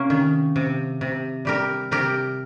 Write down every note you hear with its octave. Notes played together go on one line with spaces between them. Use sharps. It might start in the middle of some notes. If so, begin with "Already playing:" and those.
Already playing: C3 A#3 C#4
D#3
C3
C3
G3 G4 A#4
C3 G4 A#4